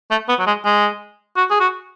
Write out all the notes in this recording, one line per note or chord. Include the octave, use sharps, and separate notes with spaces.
A3
B3
F#3
G#3
G#3
F#4
G#4
F#4